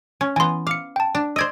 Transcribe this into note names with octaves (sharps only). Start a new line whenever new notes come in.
C#4
E3 B3 G#5 C6
F5 D6 C#7
G5 A5
D4
C5 D5 D#5 E6 G#6